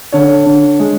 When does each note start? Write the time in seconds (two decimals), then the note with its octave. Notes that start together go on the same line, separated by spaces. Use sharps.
0.12 D3 C#5
0.46 D3
0.79 G#3